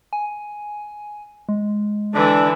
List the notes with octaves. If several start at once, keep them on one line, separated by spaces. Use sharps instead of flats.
G#5
G#3
D3 E3 D4